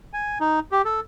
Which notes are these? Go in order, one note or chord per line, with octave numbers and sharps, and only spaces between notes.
G#5
D#4
G4
A4